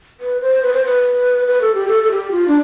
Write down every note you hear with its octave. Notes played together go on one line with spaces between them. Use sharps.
B4
C5
B4
C5
B4
B4
A4
G4
A4
A4
G4
F4
D4